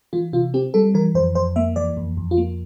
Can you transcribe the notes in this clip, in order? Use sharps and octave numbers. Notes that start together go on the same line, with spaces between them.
E3 F4
C3 F4
C4 G4
G3 A4
E3 A#4
F2 C5
F2 C5
A#3 E5
E3 D5
F2
F2
F4
A#3